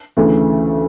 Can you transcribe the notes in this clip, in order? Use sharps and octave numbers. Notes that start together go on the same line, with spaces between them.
D2 C#3 E3 A3